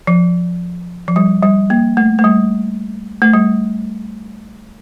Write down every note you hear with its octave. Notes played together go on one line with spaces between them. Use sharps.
F3
F3
G3
G3
A#3
A3
A3
G3
A3
G3